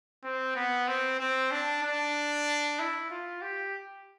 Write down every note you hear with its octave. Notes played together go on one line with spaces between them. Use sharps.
C4
B3
C4
C4
D4
D4
E4
F4
G4